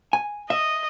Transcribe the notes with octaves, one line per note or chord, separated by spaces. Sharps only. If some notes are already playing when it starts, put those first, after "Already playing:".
G#5
D#5 E5